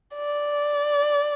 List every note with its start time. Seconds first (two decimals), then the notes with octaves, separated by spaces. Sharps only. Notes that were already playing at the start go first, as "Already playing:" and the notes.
0.15 D5